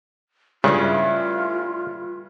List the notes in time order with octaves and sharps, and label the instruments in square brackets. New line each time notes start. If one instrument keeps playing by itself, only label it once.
[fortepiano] G2 [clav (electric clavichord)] C#3 [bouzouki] A3 C#4 E4 [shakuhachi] F4